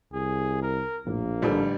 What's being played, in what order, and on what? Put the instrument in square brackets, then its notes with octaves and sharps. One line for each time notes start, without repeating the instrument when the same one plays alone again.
[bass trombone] C2 [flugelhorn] G#4
[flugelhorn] A#4
[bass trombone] A#1 [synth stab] F2 A2 [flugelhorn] A#3
[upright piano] A1 D3 G3 [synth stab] D#3 F3 A4